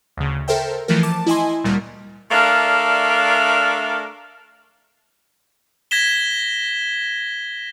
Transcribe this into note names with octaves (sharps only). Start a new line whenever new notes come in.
D2 C#3
A4 A#4 C5 E5 G5
E3 F3 A3 A#4
A5 D6
E4 D#5 G#5 C6
D2 A#2 G3 A#4
A3 D4 A#4 D5 E5 F5
G#6 A#6 B6 E7 G7